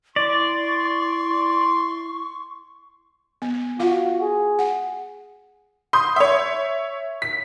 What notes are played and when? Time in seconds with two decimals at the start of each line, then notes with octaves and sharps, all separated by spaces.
0.16 E4 D5 C6 C#6
3.42 B3
3.79 F4 F#4 F5
4.21 G#4
4.59 F#5
5.93 C6 D#6 G6
6.16 C#5 E5
7.22 B6